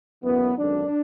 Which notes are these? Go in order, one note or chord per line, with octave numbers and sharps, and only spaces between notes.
F#1 F#2 E3 B3
G#1 F#2 D3 D4